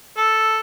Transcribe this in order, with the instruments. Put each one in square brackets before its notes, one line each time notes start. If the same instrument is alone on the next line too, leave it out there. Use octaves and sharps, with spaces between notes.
[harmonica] A4